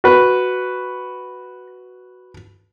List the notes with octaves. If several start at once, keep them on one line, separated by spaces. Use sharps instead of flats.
F#4 B4